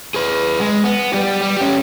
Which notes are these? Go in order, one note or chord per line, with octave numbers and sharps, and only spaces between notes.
G#4 B4
G#3
B3
G3 G4
G3
C#4 G4